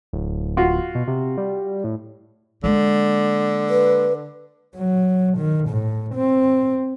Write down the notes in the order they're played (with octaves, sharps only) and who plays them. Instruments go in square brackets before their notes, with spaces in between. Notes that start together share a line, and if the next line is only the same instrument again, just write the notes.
[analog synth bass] D1
[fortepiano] F4 F#4
[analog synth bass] B2
C3
G3
A2
[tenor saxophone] D3 [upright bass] G#3 A#3
[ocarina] B4
[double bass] F#3
D#3
A2
C4